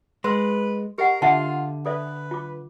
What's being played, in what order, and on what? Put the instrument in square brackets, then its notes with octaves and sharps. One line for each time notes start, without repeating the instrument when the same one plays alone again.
[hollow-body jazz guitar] G#3 [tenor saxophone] B4 [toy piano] C6 E6
[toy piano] G4 D#5 F#5 [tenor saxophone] A#4
[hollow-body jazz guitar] D3 [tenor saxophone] F4 [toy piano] E5 F#5 A5
[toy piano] A4 D5 E5 [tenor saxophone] B4
[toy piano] F4 D6